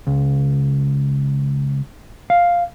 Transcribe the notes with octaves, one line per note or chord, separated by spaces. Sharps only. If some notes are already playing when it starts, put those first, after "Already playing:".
C#2
F5